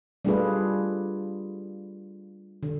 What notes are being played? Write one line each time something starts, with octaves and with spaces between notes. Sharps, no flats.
G3 A3 D4 F4 G#4 B4
D3